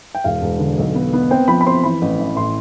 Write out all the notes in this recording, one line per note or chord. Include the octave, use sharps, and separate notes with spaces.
G5
E1 F5
E1
D3
B1
B3
B3
C4 G5
F3 B5
B5
C4 C6
E3 B5
A1
E3
A2 C6